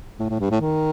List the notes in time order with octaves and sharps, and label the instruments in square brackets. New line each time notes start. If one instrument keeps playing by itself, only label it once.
[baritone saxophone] A2
A2
G2
A2
D#3